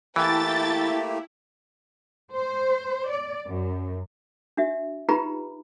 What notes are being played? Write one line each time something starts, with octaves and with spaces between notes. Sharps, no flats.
E3 A3 A#3 E4 G4 G5 A5 A6
C5
D5
F#2
D4 F#4 E5
D#4 F4 G4 B4 A#5 B5